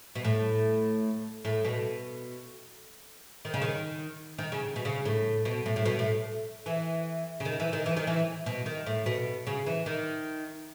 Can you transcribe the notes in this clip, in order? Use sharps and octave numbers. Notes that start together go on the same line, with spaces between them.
B2
A2
A2
B2
D#3
C#3
D#3
D#3
C#3
B2
C#3
A2
B2
A2
A2
B2
A2
E3
C#3
D#3
E3
D#3
E3
D#3
E3
B2
D#3
A2
B2
C#3
E3
D#3